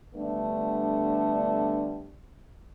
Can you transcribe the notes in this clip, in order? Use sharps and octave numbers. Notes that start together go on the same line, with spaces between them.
D3 G3 A3 B3 D4